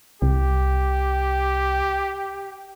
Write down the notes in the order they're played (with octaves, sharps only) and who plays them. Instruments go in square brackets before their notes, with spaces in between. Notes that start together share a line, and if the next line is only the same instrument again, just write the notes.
[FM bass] C2 [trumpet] G4